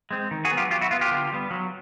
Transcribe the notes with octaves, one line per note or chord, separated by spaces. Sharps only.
G#3 C4
D#3
F#4 G#4
F#3 B3
F4 G4
F#3 F4 G4
E4 F#4
B3 F4
F4 G4
D3
G3 B3
F#3